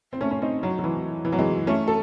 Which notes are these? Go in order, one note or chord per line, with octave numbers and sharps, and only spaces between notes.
C4
A3 C#4
C#4
C4 D#4
F#3
F#3
E3
E3
F#3
E3 G#3
A3 C#4
A4